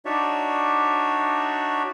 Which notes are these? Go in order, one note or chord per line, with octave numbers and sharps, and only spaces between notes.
D4 D#4 F#4 C#5 D5 E5